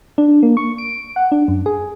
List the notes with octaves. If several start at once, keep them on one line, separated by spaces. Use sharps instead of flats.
D4
A#3
C#6
D7
F#5
D4
F#2
G#4